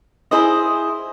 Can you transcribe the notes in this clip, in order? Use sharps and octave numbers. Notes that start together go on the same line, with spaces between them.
E4 G#4 C5 D#5